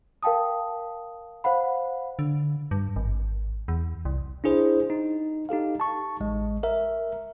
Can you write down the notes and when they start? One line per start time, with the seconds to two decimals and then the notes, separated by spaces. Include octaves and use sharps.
0.23 A#4 F5 G5 A5 D#6
1.44 C5 F5 F#5 B5
2.19 D3
2.71 G2
2.96 G#1
3.68 E2
4.05 C2
4.44 D4 E4 G#4 C5
4.90 D#4
5.49 D#4 G4 A4 F5
5.80 A5 C#6
6.20 A1 G#3 D#5
6.63 A#4 E5